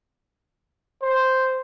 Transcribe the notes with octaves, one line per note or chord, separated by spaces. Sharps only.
C5